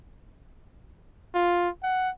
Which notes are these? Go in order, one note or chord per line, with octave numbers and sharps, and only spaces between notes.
F4
F#5